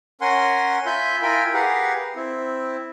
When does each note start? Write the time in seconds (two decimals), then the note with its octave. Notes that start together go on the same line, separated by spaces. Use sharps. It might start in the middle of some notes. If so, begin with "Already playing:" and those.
0.21 C#4 A#4 F#5 G#5 C6
0.86 F4 E5 G#5 B5 G6
1.22 E4 F4 A#4 G5 G#5 B5
1.54 G4 G#4 A#4 B4 F5 F#5
2.16 C4 E4